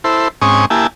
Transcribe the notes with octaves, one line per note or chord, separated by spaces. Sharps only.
E4 A4 C5
G#2 C4 C#4 G#5 C#6 D#6
A#3 E4 G4 G#5 A5